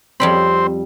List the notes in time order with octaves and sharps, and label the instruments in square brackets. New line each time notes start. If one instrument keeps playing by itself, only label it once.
[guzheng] F2 G3 B5 [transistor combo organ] C4